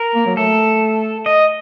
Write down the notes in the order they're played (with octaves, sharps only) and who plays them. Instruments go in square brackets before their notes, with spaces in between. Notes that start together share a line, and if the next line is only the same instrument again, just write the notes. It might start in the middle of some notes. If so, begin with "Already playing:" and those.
Already playing: [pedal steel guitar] A#4
[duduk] A#3
F#3
[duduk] A3 [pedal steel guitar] A4
[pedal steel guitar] D#5